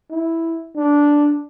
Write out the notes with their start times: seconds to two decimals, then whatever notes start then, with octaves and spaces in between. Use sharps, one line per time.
0.10 E4
0.76 D4